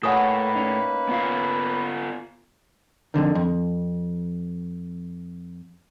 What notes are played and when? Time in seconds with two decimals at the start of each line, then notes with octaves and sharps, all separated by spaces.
0.03 A2 A#3 A4 B4 C#5 F#5 G#5 D#6
0.56 C#4 D#4
1.09 B3 F4 F5
3.14 F2 A2 D3 D#3
3.35 F2